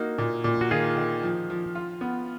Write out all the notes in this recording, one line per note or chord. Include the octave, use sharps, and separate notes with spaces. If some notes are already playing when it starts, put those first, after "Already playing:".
Already playing: A#3 D#4 F#4
A#2
A#2
F#4
D#3 F4 G#4
D#3
F3
F3
F4
B3